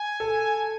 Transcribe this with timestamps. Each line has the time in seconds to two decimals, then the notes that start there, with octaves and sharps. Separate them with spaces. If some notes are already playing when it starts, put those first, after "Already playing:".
Already playing: G#5
0.20 A4